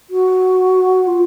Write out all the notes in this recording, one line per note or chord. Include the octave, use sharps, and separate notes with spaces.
F#4
F4